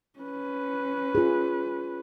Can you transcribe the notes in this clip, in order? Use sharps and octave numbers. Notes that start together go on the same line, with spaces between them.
C#4 B4
F4 G#4